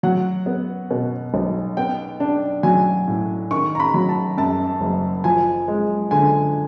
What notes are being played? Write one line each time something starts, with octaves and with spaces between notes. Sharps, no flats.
F#3 F#5
B3
B2
B1
B3 G5
D4
F#3 G#5
A2
D#3 C#6
A#5
B5
F#3
A5
F#2 A5
F#1
F3 G#5
G#3
D3 G#5